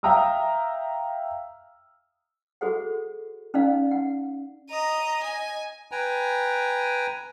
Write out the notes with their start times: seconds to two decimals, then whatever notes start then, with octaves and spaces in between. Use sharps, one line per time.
0.03 E5 F5 G5 A#5 D#6 E6
2.61 F#4 G#4 A4 C5 F#5
3.54 C#4 D#4 D5 F5
3.91 F#5
4.70 D#5 A#5 D#6
5.24 G#5
5.92 B4 G5 G#5 A#5